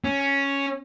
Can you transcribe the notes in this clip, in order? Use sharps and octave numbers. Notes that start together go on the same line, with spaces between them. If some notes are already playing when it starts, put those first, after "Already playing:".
C#4